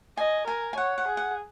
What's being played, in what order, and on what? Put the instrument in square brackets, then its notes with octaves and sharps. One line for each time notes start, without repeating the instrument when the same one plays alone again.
[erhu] D#5 [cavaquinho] G#5
[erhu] A#4 [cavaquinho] G#5
[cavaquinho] G#5
[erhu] C#5 [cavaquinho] F#5
[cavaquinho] F#5
[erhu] G#4
[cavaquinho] F#5